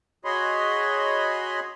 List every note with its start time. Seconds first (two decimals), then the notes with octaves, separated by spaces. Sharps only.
0.25 F#4 G#4 C#5 D#5 B5 C6